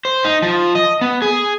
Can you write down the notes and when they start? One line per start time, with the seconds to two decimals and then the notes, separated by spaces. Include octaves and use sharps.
0.05 C5
0.25 D#4
0.42 F3
0.75 D#5
1.01 B3
1.22 G#4